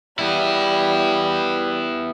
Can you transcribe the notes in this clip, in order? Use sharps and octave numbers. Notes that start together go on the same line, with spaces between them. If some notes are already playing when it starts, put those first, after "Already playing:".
G3 B3 E4